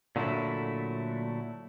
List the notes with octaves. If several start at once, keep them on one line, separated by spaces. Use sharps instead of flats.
A#2 D3 F#3 A3 E4